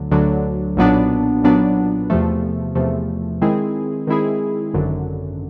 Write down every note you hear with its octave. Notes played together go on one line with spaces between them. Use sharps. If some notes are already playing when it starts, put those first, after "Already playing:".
Already playing: D2 D3 F#3
D2 D3 F#3
B1 A#2 F#3 B3 D4
B1 A#2 F#3 B3 D4
E2 C3 F3 A3
E2 C3 F3 A3
D#3 G#3 C4 E4 G#4
D#3 G#3 C4 E4 G#4
G#1 F#2 D3